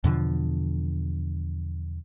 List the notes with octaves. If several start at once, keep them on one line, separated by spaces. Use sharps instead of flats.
E2 B2 D3 F3